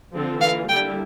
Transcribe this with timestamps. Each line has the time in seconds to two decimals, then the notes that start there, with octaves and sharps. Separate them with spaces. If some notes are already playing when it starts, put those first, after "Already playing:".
0.13 D3 F3 C4 F4 A4
0.41 E3 A#3 F4 F5
0.69 D3 G3 A#3 E4 G5